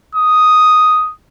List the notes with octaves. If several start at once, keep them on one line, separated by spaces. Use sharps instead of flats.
D#6